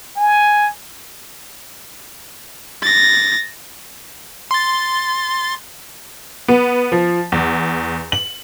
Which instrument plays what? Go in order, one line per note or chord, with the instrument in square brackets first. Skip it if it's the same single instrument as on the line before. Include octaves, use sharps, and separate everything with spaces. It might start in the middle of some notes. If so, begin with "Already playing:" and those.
[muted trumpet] G#5
[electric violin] A6 A#6
[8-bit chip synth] C6 A6
[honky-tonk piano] B3
F3
E2
F#7